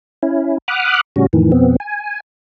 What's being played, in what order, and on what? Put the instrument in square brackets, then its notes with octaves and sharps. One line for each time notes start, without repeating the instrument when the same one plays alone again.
[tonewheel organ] C#4 E4
F#5 B5 D6 D#6 F6 F#6
A2 C#3 G3 C#4 F#4
F2 A2 D#3 E3
F2 B2 B3 C4
G#5